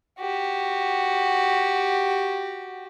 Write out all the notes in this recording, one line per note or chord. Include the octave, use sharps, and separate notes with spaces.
F#4 G4